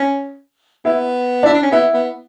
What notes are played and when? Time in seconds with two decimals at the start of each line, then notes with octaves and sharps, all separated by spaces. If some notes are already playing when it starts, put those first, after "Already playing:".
Already playing: C#4
0.85 B3 E4
1.43 D4 E4
1.54 D4
1.63 C#4
1.71 B3 E4
1.94 B3